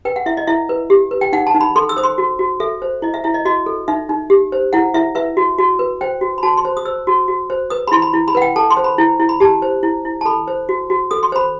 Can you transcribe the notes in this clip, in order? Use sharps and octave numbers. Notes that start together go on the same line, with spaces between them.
B4 G5
F#5
E4 E5
D#5
E4 E5
B4
G4
B4
G5
D#4 F#5
A5
D#4
B5
A4 C6
E6
C5 D#6
C6
F#4
F#4
A4 E5
C5
E4 D#5
E5
E4 E5
D#5
F#4 D#5
A4
D#4 E5
D#4
G4
C5
E4 F#5
E4 E5
B4 E5
F#4
F#4
B4
C5 G5
F#4
B5
F#4 A5
C6
C5
D#6
C5 E6
F#4
F#4
C5
B4 D#6
B5
E4 C6
B5
E4
B5
B4 F#5
G5
A4 A5
C6
C5
B5
E4
E4
B5
G4 A5
C5
E4
E4
A5
A4 B5
C5
F#4
F#4
A4 D#6
C6
C5 B5